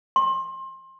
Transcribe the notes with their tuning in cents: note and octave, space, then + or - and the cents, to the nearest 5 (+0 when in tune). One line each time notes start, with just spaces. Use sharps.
C6 +25